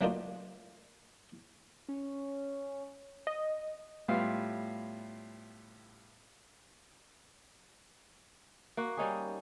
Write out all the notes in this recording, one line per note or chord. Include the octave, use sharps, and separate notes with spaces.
F#3 A3 A#3 D4 D#4 F4
C#4
D#5
A2 G3 B3 F4 F5
A#3 F#4
G3 C#4 D#4 G#4